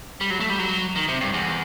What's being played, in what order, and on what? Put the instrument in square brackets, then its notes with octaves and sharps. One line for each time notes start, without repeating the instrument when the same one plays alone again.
[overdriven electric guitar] G3
F#3
A3
G3
F#3
D#3
C3
G2
E2